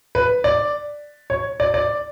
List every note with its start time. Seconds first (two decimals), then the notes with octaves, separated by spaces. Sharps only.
0.15 B4
0.44 D5
1.30 C#5
1.60 D5
1.74 D5